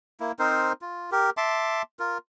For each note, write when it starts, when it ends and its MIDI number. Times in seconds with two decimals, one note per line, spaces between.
0.20 0.32 58
0.20 0.32 64
0.39 0.73 60
0.39 0.73 63
0.39 0.73 70
0.39 0.73 72
0.82 1.10 65
1.12 1.30 67
1.12 1.30 70
1.37 1.82 76
1.37 1.82 81
1.37 1.82 84
1.37 1.82 86
1.99 2.18 65
1.99 2.18 70